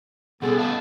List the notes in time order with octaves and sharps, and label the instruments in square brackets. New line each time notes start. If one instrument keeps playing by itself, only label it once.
[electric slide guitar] B2 G3 C#4 [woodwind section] B3 A4 [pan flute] G#4
[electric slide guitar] A2 D#5 F5 [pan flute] A5